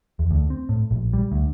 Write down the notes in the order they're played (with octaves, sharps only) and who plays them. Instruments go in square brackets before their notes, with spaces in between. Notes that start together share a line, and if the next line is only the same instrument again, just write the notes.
[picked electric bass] E2
D2
C4
A2
A#1
G3
D2